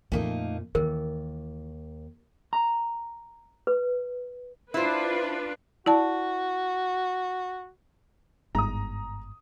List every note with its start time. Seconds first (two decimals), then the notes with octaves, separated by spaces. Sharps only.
0.12 F2 A#2 A3 A#3 D#4
0.75 D#2 E3 A#4
2.53 A#5
3.67 B4
4.74 D4 E4 F4 B4 C5
5.86 E4 F#4 D5 A5
8.55 G1 G#2 A#5 D#6